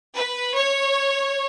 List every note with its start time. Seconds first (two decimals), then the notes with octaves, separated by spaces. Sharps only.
0.15 B4
0.56 C#5